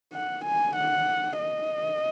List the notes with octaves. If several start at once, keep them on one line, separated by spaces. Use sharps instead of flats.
F#5
G#5
F#5
D#5